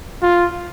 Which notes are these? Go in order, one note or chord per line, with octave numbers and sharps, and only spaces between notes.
F4